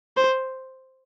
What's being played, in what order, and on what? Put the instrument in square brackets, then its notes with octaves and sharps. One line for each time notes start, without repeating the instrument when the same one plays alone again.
[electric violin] C5